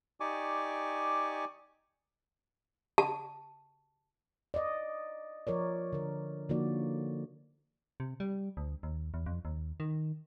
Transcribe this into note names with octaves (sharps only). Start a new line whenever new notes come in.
D#4 G4 D5 G#5 C#6 D6
A5
D5 D#5
F3 A#4 C#5 D5
D3 A#4
D3 F3 A#3 D#4 F#4 D5
C3
G3
D2
D#2
E2
F2
D#2
D#3